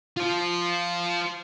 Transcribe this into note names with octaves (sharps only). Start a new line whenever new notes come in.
F4 C5